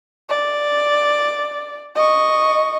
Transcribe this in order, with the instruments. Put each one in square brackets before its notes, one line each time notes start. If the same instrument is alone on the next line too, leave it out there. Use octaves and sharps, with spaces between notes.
[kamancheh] D5
D#5 C#6